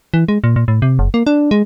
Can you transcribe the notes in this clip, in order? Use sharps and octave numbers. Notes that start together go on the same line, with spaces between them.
E3
G#3
A#2
A#2
A2
C3
F#1
A#3
D4
G#3